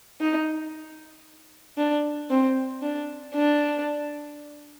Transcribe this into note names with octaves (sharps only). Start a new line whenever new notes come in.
D#4
D4
C4
D4
D4